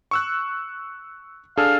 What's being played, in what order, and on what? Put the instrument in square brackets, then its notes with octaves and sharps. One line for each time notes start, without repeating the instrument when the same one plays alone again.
[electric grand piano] C#6 E6 F#6
[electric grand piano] D4 G#4 A4 [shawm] F5